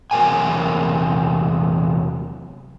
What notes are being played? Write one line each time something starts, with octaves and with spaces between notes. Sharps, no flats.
E2 C3 F#3 A#4 G5 G#5